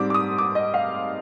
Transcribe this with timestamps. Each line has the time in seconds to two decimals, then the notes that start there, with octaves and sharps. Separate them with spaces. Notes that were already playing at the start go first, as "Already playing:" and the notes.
Already playing: G#2 G3 C4 D6
0.10 D6
0.14 D#6
0.38 D6
0.55 D#5
0.74 F5